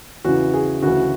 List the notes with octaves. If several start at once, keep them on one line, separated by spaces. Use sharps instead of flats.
E2 C#3 E3 F#4
G#4
D2 C#3 E3 F#4